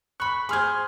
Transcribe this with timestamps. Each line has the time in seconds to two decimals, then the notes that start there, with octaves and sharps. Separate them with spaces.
0.20 B5 C#6 F#6
0.49 G#4 C5 C6 F6 G#6